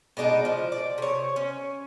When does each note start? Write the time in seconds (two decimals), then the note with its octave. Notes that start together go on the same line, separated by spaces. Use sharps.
0.17 B2 G#3 D4 D#4
0.45 F3
0.72 D5
0.98 C3 C#5
1.36 C#4